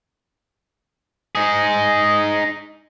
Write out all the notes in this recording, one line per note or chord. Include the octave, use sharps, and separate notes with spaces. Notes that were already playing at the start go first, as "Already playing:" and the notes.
D#4 G#4